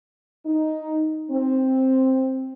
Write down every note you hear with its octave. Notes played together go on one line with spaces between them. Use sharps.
D#4
C4